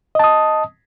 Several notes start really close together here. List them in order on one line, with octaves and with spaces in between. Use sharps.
D#5 A5 D#6